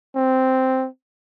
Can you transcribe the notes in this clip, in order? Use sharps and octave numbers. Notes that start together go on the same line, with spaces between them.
C4